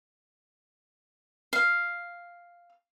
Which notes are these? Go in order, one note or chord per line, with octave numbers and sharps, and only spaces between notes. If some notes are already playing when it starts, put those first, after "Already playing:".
F5